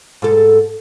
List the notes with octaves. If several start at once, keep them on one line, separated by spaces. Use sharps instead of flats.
G#2 A4